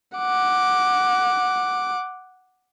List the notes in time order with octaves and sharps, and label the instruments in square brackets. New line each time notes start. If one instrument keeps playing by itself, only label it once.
[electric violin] F#5 D6